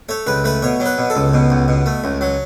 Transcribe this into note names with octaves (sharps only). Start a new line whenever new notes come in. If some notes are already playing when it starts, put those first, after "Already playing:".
A3 C#5
C#2 B4
A3 B4
B2 C#5
F#3
B4
B2
A4
C#2
B2
C#2
B2
A3
C#2
F#3